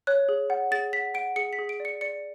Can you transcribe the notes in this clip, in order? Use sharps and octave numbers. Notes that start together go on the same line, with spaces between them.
C#5 F#6
G#4
F#5
G#4 A6
F#5 B6
F#5 D7
G#4 C#7
B6
G#4
D7
D5
C#7
D5 C#7